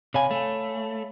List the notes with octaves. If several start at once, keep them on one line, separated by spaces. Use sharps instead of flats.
C3 C#5 F5 G#5 B5
A3